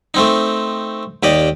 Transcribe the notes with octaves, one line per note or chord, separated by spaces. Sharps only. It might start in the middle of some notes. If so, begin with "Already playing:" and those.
A3 C4 D#4
D#2 G4 D5 D#5